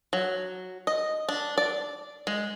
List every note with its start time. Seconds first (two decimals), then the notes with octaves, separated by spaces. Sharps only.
0.13 F#3
0.87 D#5
1.29 D4
1.58 D5
2.27 G#3